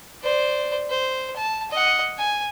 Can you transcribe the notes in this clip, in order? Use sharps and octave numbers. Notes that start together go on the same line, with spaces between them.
C5 D5
C5
A5
D#5 F#5
G#5